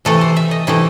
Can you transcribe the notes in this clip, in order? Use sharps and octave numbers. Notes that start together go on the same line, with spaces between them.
C3 E3 A3 A4
C5
E5
D#5
C3 E3 A3 E4